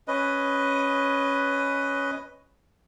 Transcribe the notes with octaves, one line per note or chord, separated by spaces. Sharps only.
C#4 B4 D#5